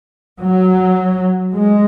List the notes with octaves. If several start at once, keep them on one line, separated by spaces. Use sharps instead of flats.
F#3
G#3